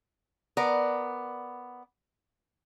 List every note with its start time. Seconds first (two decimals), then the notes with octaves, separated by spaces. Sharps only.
0.57 B3 A#4 D5